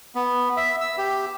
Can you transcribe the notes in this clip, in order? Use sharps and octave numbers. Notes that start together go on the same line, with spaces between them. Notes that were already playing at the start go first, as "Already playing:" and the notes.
B3
E5
E6
G4